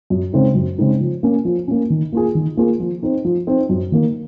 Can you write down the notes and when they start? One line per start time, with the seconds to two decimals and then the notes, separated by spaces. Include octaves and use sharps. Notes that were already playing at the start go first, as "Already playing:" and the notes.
0.10 F#2
0.33 C#3 G#3 C4 D#4
0.55 F#2
0.78 C#3 G#3 C4 D#4
1.00 F3
1.23 A#3 C#4
1.45 F3
1.68 A#3 C#4
1.90 D#3
2.13 A#3 F4 G#4
2.35 D#3
2.57 A#3 F4 G#4
2.80 F3
3.03 C4 D#4
3.25 F3
3.47 C4 D#4
3.69 F#2
3.92 D#3 A#3